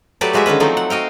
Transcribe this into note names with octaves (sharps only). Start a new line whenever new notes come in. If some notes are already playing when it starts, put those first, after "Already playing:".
F#3 A3 F#4 G4 B4 D5
F3 G#3 F#4 G#4 E5
D3 D#3 C#4 B4
F3 F#3 A3 C4 D#4 A4
F#5
F#4 D#5 F5 G5